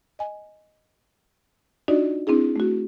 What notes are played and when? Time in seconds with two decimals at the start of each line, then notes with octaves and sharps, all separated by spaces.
0.19 D#5 G#5
1.88 D4 D#4 F4 F#4 D5 D#5
2.27 C4 D4 E4 G#4
2.56 A3 F#4